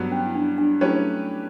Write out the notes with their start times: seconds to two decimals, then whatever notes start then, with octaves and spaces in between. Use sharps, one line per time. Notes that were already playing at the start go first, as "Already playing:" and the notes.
Already playing: G2 F#3 B3
0.12 C#4
0.26 E4
0.35 D4
0.58 D4
0.81 F#3 A3 C#4 E4 G4 B4